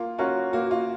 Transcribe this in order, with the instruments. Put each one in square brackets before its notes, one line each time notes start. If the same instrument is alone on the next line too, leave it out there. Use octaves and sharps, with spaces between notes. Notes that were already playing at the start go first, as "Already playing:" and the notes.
Already playing: [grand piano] A#3 [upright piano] F4
[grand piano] C#4 F#4 A#4 [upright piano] F4
[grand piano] A#3 [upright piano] F#4
[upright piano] F4